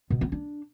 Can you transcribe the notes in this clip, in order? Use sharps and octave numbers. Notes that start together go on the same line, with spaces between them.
B2
B3
D4